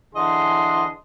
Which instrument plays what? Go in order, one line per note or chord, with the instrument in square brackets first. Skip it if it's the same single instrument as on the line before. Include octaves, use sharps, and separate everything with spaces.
[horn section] D3 E3 G#4 D#5 C6